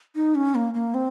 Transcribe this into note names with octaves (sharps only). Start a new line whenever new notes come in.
D#4
C#4
A#3
A#3
C4